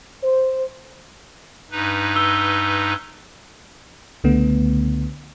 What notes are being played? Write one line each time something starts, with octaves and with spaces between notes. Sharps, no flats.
C5
G2 D#4 B4
E6 G7
C#2 D3 A3 B3